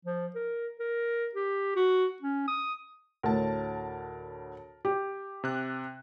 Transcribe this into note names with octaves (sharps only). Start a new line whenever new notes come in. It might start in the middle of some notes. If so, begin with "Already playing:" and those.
F3
A#4
A#4
G4
F#4
C#4
D#6
D2 A2 A#4 A5
G4
C3 F#6